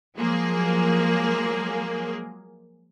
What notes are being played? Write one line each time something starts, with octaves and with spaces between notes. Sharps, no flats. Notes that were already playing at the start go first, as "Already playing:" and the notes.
F3 F#3 G#3 A#3 G#4